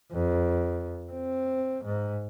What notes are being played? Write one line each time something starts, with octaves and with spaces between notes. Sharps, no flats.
F2
C4
G#2